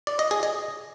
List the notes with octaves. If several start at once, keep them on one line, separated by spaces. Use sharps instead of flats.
D5
D#5
G#4
D#5